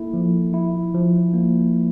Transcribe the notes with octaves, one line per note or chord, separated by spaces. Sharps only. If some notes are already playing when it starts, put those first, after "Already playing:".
Already playing: A#3 E4 A4
F3
E4
F3
A#3